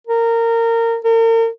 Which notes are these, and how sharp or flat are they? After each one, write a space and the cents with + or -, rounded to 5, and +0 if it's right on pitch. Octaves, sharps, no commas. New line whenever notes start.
A#4 -20
A#4 -40